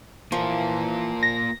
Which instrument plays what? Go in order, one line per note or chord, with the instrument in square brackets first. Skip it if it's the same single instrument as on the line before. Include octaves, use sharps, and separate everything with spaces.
[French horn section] E3 [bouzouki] F3 [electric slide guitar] A#3 F4 A#4
[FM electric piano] A#6